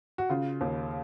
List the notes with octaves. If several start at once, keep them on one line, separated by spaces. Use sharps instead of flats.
F#4
C#3 F4
D#2